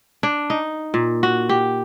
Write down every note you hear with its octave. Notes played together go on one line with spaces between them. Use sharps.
D4
D#4
A#2
F#4
G4